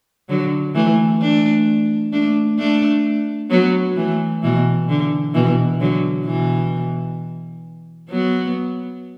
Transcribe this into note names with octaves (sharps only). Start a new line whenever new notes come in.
D3 F#3
E3 A3
A3 D4
A3 D4
A3 D4
F#3 B3
E3 A3
B2 E3
D3
B2 E3
D3 F#3
B2 E3
F#3 B3